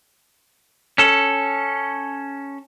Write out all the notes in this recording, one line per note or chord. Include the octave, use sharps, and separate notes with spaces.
C#4 A4